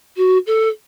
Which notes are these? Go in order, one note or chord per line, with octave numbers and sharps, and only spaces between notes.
F#4
A4